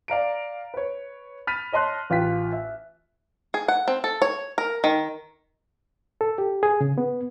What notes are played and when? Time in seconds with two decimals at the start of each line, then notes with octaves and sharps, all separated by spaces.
0.08 D5 F5 A#5 D7
0.74 B4 C#5
1.47 B5 F6 A6 B6 D#7
1.72 C#5 D#5 A5 C6 F#6
2.10 A1 F4 F5 G5 B6
2.53 E5
3.54 G#4
3.68 F#5
3.88 C4
4.04 A4
4.22 C#5
4.58 A#4
4.84 D#3
6.21 A4
6.38 G4
6.63 G#4
6.81 C#3
6.98 B3